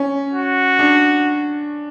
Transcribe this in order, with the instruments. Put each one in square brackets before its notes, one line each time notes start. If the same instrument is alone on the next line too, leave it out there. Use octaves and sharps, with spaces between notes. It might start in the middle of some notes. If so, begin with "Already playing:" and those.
Already playing: [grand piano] C#4
[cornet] F#4
[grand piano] D4